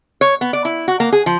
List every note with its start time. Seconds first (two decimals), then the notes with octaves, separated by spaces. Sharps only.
0.21 C#5
0.41 B3
0.53 D5
0.65 E4
0.88 F#4
1.00 A#3
1.13 G#4
1.26 F3